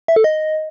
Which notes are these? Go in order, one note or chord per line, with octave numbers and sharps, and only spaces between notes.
E5
A4
D#5